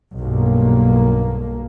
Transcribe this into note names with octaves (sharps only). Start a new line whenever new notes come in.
B1 G2 A#3